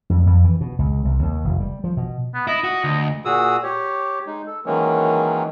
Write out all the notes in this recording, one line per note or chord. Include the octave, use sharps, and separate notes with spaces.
F2
F2
E3
B2
C#2
C2
D#2
F1
G3
F3
B2
B3
E4 D#5
F#4
D2
A#2 F#4 G#4 D#6 E6
G4 C#5
G#3 D#4
A4
D#3 E3 F#3 G#3 A#3 C#4